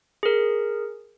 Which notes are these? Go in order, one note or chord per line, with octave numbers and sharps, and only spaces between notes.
G#4 A#4